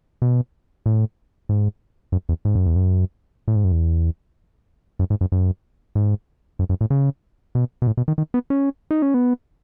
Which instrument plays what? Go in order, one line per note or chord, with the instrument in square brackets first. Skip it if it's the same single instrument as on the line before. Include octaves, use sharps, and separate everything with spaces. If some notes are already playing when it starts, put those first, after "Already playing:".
[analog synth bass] B2
A2
G#2
F#2
E2
G#2
F#2
E2
F#2
A2
G#2
F#2
E2
F#2
G#2
F#2
F#2
G#2
F#2
F#2
A2
C#3
B2
B2
A2
B2
D#3
D#3
B3
C#4
D#4
C#4
B3